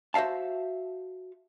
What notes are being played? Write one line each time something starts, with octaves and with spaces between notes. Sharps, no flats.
F#4 C5 E5 F5 A5